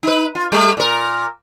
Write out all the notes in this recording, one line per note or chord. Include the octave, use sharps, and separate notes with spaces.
D#4 B4
F4
G3 A3
A#2 A#4